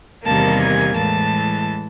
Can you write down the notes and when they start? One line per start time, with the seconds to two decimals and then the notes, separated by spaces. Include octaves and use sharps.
0.24 E2 C3 D#3 G3 A#3 A5
0.60 G#5
0.96 A2 E3 G#3 A5